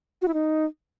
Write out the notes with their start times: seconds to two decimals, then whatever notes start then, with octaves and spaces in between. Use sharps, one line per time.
0.22 F#4
0.28 E4
0.34 D#4